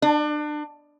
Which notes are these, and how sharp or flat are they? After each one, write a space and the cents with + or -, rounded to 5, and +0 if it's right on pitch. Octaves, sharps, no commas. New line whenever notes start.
D4 +30